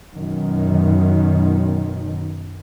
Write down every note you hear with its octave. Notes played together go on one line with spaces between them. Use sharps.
F#2 B2 D#3